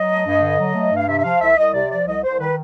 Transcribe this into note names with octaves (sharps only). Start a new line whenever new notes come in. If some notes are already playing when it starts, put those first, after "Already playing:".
Already playing: F#3 D#5
A3
G2
D3
F#3
A3
G2
F5
C3 E5
E5
F3 F5
C2 E5
C2 D#5
C3 D5
F3 D5
C2 D#5
C2 C5
D#3 B4